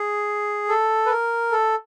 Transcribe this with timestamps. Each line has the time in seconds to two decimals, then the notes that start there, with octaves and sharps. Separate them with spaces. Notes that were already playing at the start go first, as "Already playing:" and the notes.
Already playing: G#4
0.69 A4
1.06 B4
1.10 A#4
1.52 A4